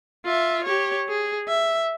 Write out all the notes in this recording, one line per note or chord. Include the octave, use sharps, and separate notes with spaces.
F4 E5
G4 C#5
G#4
E5